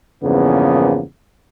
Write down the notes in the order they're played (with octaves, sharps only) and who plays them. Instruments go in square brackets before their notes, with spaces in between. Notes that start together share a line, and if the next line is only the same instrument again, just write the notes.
[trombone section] E2 G2 C#3 F3 A#3 B3